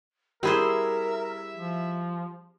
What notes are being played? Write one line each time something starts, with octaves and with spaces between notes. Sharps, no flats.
G3 C4 E4 G#4 A#4 C5 E5
F3